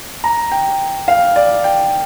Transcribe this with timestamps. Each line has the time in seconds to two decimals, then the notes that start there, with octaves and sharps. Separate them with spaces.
0.24 A#5
0.52 G5
1.08 F5
1.36 D5
1.64 G5